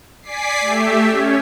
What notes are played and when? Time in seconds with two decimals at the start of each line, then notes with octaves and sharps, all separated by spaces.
0.22 D5 G#5 D6 B6 C7
0.61 A3 G4 E5
1.09 C#4 C#5